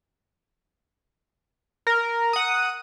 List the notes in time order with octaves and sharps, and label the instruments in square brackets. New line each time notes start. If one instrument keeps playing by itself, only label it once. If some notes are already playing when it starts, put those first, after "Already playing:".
[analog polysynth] A#4
F#5 D#6